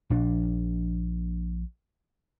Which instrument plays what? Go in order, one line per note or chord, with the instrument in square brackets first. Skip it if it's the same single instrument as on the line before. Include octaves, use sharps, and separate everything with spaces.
[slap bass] A#1 D4